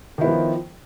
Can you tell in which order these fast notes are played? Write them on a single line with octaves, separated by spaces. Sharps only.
D#3 E4 B3 F3